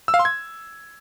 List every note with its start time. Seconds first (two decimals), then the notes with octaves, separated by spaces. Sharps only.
0.08 E6
0.14 F5
0.19 C6
0.25 G#6